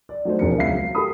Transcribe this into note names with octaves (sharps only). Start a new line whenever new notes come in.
D5
F#3 A3 D#4 F#4 C5
E1 F2 D4 F#4 A#4 C#7
C#2 F#3 E5 F5 C7
F#3
F#4 G4 A4 A#4 B5 D#6